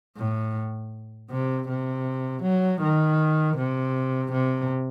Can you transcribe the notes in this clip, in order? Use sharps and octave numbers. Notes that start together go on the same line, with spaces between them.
A2
C3
C3
F#3
D#3
C3
C3